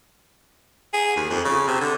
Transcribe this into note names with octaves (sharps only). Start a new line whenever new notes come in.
G#4
D#2
F2
C#3
C3
D3